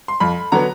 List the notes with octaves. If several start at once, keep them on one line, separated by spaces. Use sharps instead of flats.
C6
F2 B5
D3 F#3 B3 A#5